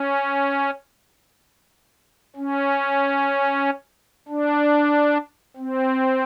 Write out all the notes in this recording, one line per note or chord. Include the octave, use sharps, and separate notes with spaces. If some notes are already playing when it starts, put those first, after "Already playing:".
Already playing: C#4
C#4
D4
C4